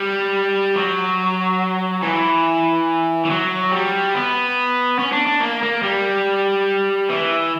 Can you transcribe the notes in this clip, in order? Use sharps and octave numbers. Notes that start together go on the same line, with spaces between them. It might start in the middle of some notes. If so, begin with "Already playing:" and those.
Already playing: G3
F#3
E3
E3
F#3
G3
B3
C#4
D4
D4
A#3
A#3
G3
E3